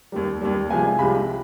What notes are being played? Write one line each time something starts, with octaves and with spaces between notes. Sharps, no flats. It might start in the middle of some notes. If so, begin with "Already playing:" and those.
D#2 D#3 G3
D#2 D#3 G3
C2 C3 F3 G#3 G#5
C2 C3 F3 G#3 B5